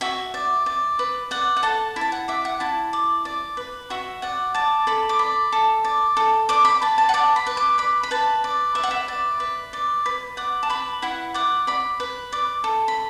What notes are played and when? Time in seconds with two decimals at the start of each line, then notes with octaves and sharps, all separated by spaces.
0.01 F#4 E5
0.34 D5
0.66 D5
0.99 B4
1.31 D5 F#5
1.57 F#5
1.63 A4 A5
1.96 E4
2.01 A5
2.12 F#5
2.28 D5 E5
2.45 F#5
2.60 E4 A5
2.93 D5
3.25 D5
3.57 B4
3.90 F#4 E5
4.22 D5 F#5
4.54 D5 A5
4.87 A4 B5
5.09 D6
5.19 D5 B5
5.53 A4
5.84 D5
6.17 A4
6.49 D5 D6
6.65 B5
6.82 B4 A5
6.98 A5
7.09 F#5
7.14 D5 A5
7.36 B5
7.47 B4
7.57 D6
7.78 D5 B5
8.03 B5
8.11 B4 A5
8.44 D5
8.75 B4 E5
8.83 F#5
8.91 E5
9.08 D5
9.40 B4
9.73 D5
10.06 B4
10.37 D5 F#5
10.63 A5
10.70 B4 B5
11.02 E4 F#5
11.34 D5 F#5
11.67 D5 B5
12.00 B4
12.32 D5
12.64 A4
12.88 B5